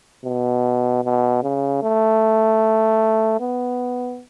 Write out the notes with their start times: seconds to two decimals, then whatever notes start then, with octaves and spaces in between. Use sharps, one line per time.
0.25 B2
1.04 B2
1.43 C#3
1.83 A3
3.40 B3